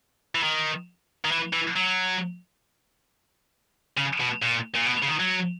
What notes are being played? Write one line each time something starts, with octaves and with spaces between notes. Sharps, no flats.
E3
D#3
D#3
E3
E3
F#3
C#3
B2
A#2
A#2
B2
C#3
D#3
F#3